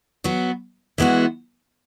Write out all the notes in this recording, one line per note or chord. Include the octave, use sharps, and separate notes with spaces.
F#3 B3 F#4
E3 G#3 B3 F#4